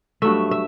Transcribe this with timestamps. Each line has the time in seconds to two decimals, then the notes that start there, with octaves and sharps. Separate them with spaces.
0.22 G2 F#3 A3 E5
0.51 E5